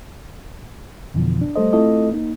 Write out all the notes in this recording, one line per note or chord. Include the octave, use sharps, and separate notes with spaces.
F2 B2 D3 E3 F3
D4
G3 A3 A4 C5 D#5
A3 C4 E4 F4 A4 D#5
A#3 D#4